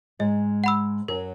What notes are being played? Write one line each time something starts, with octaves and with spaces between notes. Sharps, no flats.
G#2 G#3 D#5
F#5 B5 E6
F#2 F#3 A#4